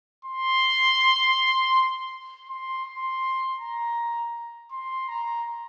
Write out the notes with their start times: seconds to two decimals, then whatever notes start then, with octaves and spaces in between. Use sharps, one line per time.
0.25 C6
2.48 C6
2.85 C6
3.60 A#5
4.71 C6
5.08 A#5